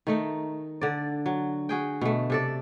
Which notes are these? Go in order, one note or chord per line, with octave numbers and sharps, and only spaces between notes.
D#3 A3 D#4
D3 D5
F#3
F#4 G#4 G5
B2 A3
C3 A4 D5